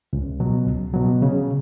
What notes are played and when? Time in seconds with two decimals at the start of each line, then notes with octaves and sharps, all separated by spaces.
0.13 C#2
0.40 B2 F#3
0.67 C#2
0.94 B2 F#3
1.22 C#3